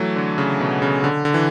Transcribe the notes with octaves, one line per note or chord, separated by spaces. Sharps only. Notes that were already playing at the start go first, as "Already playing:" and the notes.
Already playing: E3 F#3 A3
D3
C#3
B2
C#3
D3
D3
E3